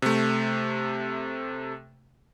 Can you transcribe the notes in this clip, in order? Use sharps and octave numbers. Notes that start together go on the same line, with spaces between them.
C3 A3